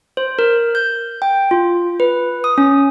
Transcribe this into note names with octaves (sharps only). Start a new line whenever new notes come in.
C5
A#4
G6
G5
F4
B4
D#6
C#4